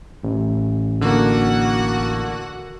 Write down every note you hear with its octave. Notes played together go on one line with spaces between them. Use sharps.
A1
D3 A#3 F#4 F#5